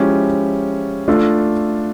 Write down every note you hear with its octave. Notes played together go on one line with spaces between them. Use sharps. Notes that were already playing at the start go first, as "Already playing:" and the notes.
Already playing: F3 G#3 C#4 E4 G4
A3 D4 F4 A4